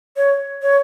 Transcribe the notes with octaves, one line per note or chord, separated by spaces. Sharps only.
C#5
C#5